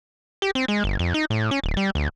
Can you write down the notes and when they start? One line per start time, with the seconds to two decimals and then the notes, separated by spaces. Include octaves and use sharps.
0.42 G4
0.55 C4
0.68 G#3
0.84 G1
0.99 F2
1.14 D#4
1.30 A2
1.51 C#4
1.64 D1
1.77 G3
1.95 D2